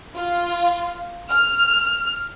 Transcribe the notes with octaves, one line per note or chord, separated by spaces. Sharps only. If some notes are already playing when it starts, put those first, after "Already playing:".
F4
F6